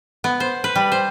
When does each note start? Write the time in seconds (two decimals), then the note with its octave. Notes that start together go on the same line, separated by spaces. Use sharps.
0.24 B3
0.40 C5
0.64 B4
0.75 G3
0.92 C5